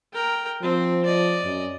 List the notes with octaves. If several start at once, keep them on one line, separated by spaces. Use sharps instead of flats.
A#4 G5
F3 C4
D5 D#5
F#2